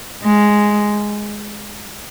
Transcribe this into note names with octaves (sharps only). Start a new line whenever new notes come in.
G#3